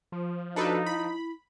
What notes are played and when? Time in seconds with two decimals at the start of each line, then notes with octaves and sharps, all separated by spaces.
0.12 F3
0.56 D4 D#4 F#4 A4 B4
0.86 E4 B5